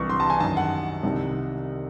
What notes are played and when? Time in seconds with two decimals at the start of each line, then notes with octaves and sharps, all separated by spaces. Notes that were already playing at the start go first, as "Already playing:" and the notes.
Already playing: C2 C3 E3 C#6
0.10 C6
0.20 A5
0.30 G#5
0.40 F#2 D#3 A5
0.57 F#5
1.03 C2 C3 D#3